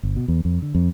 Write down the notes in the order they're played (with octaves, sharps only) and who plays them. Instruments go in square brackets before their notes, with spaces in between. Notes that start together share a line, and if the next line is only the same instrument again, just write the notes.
[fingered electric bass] G1
B2
E2
F2
D3
F2